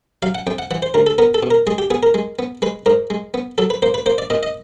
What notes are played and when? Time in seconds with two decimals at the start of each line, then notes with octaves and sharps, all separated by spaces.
0.22 F#3 F5
0.35 F#5
0.47 F2 G5
0.58 F#5
0.71 E3 F#5
0.82 C5
0.94 D2 A#4
1.07 A4
1.18 B3 A#4
1.34 A4
1.43 B2
1.51 A#4
1.67 G#3 G#4
1.78 G4
1.90 B3 G#4
2.03 A#4
2.14 G#3
2.39 B3
2.62 G#3 B4
2.86 G#2 A#4
3.10 G#3
3.34 B3
3.58 F#3 A4
3.70 B4
3.82 A#3 C5
3.94 B4
4.06 A#3 C5
4.18 D5
4.30 A#2 D#5
4.43 D#5